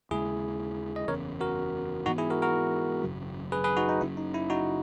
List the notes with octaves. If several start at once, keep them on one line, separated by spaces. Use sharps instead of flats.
D#2 C#3 G#3 E4 G#4
D#5
F#1 E2 C#3 A#4 C#5
F#4 A#4
G#2 E3 B3 D#4 F#4
E4 G#4
F#4 A#4
F#4 A#4
G#1 F#2 C#3 F#3
G#4 B4
G#4 B4
D#4 F#4
D#4
F#1 F#2 C#3 E4
D#4
E4
D#4 F#4